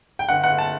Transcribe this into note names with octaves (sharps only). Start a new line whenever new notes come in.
G5
G1 F#5
G1 F#5
A5